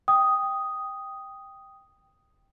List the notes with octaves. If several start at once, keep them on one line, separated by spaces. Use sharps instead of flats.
G5 D#6